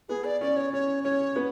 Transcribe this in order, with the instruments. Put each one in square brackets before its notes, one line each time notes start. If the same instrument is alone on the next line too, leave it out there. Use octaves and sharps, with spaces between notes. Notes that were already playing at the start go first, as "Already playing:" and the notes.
[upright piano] B3 [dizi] G#4
[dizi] D5
[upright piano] C#4 [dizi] D5
[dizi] C#5
[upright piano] C#4 [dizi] C#5
[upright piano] C#4 [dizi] C#5
[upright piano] B3